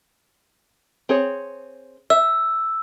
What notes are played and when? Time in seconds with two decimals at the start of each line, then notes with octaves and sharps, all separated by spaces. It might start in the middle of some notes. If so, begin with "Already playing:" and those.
1.09 C4 G#4 C#5
2.10 E5 E6